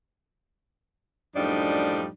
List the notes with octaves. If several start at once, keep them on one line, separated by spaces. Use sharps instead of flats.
F#2 A2 F3 G3 D4 D#4